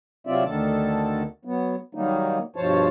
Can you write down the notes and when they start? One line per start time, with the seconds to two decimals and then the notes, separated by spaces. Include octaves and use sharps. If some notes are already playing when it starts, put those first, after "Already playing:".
0.27 C3 F#3 C4 F4 D5 E5
0.45 D2 D3 D#3 A4 A5
1.45 F#3 B3
1.95 D#3 F#3 G3 A#3 D#4
2.56 G2 B2 F3 C5 C#5 A5